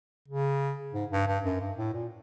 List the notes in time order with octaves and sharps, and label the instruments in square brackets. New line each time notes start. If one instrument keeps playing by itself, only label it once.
[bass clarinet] C#3
G#2
G2
G2
F#2
G2
A2
A#2